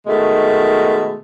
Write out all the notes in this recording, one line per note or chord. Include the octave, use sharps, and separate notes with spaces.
B2 D#3 G#3 A3